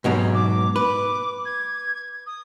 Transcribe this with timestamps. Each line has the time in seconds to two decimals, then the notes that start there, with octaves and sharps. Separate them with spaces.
0.04 G#2 B2 F#3
0.34 D6
0.76 B4 D6
1.45 G#6
2.27 D#6